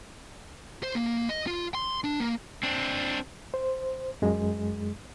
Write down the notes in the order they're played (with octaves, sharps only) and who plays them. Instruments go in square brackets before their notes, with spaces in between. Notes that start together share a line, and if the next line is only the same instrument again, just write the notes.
[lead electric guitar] C5
A#3
D#5
F4
C6
D4
A#3
[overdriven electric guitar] C4 D4
[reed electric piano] C5
F#2 G#3